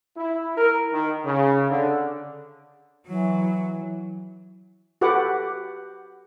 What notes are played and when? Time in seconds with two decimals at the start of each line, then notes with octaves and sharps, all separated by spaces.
0.17 E4
0.58 A#4
0.92 D#3
1.24 C#3
1.70 D3
3.08 E3 F#3
5.01 F#4 G4 A4 B4 F#5 D6